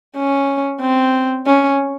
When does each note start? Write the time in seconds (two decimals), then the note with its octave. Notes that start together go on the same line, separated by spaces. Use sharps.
0.16 C#4
0.80 C4
1.46 C#4